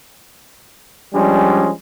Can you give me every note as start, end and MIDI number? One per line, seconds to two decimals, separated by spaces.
1.14 1.70 53
1.14 1.70 55
1.14 1.70 56
1.14 1.70 61
1.14 1.70 62